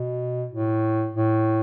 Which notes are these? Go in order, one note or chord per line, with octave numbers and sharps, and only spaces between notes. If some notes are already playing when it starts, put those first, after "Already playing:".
Already playing: B2
A2
A2